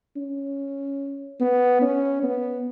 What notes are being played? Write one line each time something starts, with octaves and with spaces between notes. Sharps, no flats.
C#4
B3
C#4
B3